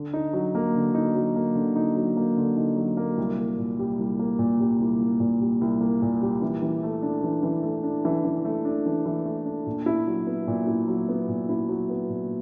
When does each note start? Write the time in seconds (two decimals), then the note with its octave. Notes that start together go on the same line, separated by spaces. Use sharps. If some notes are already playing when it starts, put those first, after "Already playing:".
Already playing: D3
0.13 D#4
0.33 F#3
0.55 A#3
0.75 D3
0.94 D#4
1.15 F#3
1.36 A#3
1.55 D3
1.76 D#4
1.97 F#3
2.17 A#3
2.37 D3
2.57 D#4
2.77 F#3
2.97 A#3
3.17 C2
3.38 A#3
3.58 A#2
3.79 G3
3.99 C2
4.19 A#3
4.39 A#2
4.60 G3
4.80 C2
5.00 A#3
5.20 A#2
5.41 G3
5.61 C2
5.81 A#3
6.02 A#2
6.22 G3
6.42 E3
6.62 E3
6.83 A3
7.02 D4
7.24 E3
7.43 E3
7.63 A3
7.83 D4
8.05 E3
8.25 E3
8.45 A3
8.65 D4
8.86 E3
9.05 E3
9.25 A3
9.46 D4
9.66 A#2
9.86 E4
10.07 F#3
10.27 B3
10.48 A#2
10.67 E4
10.87 F#3
11.09 B3
11.29 A#2
11.49 E4
11.69 F#3
11.90 B3
12.10 A#2